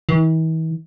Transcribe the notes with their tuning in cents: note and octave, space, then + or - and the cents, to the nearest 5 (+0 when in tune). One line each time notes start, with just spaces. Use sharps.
E3 -45